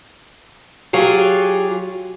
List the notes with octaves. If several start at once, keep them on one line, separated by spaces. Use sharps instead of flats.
F#3 F4 G4 G#4